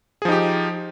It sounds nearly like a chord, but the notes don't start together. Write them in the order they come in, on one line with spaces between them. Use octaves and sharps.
G#4 F3 D#4 G4